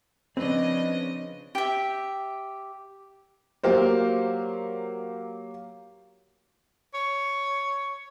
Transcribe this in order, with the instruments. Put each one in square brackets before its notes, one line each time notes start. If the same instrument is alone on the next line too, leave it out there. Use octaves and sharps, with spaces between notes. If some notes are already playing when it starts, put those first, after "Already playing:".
[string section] C#3 F3 D#5 [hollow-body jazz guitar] C4 [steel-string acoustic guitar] D4 B4
[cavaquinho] G4 E5
[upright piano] F#3 A#3 F4 G4 A#4 C5
[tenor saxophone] C#5